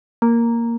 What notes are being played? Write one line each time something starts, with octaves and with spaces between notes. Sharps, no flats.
A#3